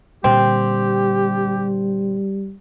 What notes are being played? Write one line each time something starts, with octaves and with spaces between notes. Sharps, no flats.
A#2 D3 G3 C4 G4